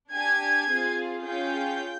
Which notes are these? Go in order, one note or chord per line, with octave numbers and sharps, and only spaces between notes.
D4 G4 G#5 G#6
C4 F4 G#4
C#4 F4 G#4 G5 G6